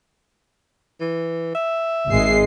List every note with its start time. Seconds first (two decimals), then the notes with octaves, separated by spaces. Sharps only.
1.01 E3
1.55 E5
2.09 G#1 G#3 C7